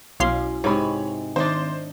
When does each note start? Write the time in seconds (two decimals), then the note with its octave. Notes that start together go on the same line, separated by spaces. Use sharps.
0.20 B1 C#4 E4 F#4 F5 C6
0.64 G#2 C3 G#3 C#5 B5
1.36 D#3 D4 D#4 C5 E5 G7